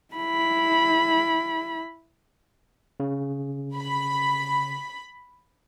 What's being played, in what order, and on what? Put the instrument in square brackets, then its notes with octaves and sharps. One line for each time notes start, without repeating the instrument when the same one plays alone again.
[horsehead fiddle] E4 B5
[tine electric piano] C#3
[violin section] B5